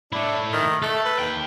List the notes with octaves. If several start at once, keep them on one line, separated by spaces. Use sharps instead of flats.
A3 D4 E4
D#3
A3 A4
B4
D#2 G5